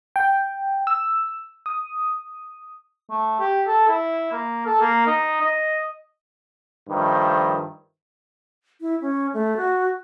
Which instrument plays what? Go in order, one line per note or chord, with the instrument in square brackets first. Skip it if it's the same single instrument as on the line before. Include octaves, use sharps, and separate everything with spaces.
[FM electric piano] G5
E6
D#6
[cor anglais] A3
G4
A4
E4
A#3
A4
A#3
D#4
D#5
[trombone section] G2 D#3 F3 A3
[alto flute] E4
C#4
A3
F#4